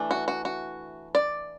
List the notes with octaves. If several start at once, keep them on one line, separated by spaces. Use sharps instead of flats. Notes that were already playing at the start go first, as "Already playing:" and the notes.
Already playing: E3 A3 D4
F#4
F#4
F#4
D5